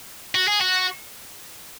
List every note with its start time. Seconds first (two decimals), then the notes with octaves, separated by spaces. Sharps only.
0.35 F#4
0.48 G#4
0.61 F#4